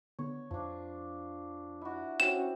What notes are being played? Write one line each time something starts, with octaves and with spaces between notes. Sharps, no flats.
D3 B3 C#5
F2 F3 D4
E4 F#4
C4 C#4 F#4 E7